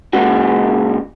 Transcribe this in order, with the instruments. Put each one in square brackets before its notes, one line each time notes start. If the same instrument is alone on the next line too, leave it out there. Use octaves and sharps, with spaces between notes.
[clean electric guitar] A#2 C#3 G#3 F#4